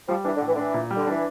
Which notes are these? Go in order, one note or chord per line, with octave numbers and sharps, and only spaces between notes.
F3 G3
E3 D4
D3
A2
E3
D3
E3 D4
A#2
G3
D3
E3 D4